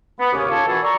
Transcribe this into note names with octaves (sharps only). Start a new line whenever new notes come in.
B3
D#2 G#2 C#3 C#4 D6 D#6
C#4 F4 G4 A4 C#5
B2 D#3 E3 F#4 G#4 A4
D5 A#5 C#6